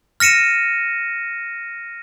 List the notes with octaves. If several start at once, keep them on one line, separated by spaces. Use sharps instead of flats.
F6 A#6 C#7 D#7 E7